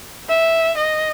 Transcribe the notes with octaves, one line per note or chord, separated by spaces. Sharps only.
E5
D#5